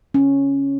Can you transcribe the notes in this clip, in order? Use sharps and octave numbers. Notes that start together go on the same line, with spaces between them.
C#4